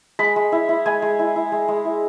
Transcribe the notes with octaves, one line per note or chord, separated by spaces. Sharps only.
G#3 B5
G#3
E4
E4
G#3 G#5
G#3
E4
E4
G#3
G#3
E4